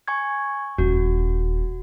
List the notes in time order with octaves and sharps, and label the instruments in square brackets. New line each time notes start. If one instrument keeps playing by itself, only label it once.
[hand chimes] G#5 C#6 G#6
[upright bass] D#1 [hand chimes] F#4